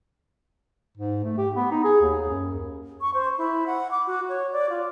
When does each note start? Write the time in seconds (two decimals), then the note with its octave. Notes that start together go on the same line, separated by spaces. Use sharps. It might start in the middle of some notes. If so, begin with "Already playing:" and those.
0.97 G#2
1.24 A3
1.38 G4
1.56 B3
1.71 D#4
1.84 G#4
2.01 D#2
2.30 F#2
3.01 C#6
3.14 C5
3.38 E4
3.67 F#5
3.91 D6
4.07 F#4
4.29 C#5
4.53 D5
4.70 F4